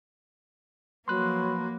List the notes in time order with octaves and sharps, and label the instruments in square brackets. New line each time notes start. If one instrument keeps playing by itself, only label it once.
[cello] F3 A#3 [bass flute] F#3 [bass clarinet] B4 [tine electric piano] C6 F#6